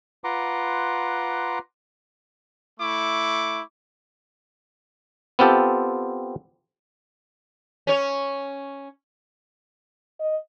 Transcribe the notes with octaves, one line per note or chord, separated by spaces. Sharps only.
F4 B4 F#5 A#5 C6 D6
A3 E4 C#6 D6
B3 C4 F4 G4 A4
C#4 C#5
D#5